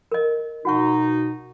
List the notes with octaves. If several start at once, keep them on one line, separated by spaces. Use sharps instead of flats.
A#4 D#5
B2 D#4 F#4 F#5 C#6